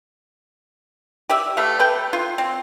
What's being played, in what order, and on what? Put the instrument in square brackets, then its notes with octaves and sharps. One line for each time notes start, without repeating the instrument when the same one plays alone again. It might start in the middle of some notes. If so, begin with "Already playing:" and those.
[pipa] G4 D5 E5
A3 B4 E5 F5
A4 B4 G5
F4
C4